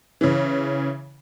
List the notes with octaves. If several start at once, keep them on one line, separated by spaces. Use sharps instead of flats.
C#3 E3